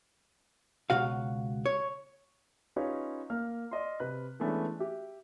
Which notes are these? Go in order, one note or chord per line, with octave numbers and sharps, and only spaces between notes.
C#2 G2 B2 F#4 F5
C#5
C#4 D#4 F4 G4 B4 C#5
A#3 F6
D5 D#5 C6
C3 B4 F#6
E3 G#3 A3 B3 C#4 D4
G4 E5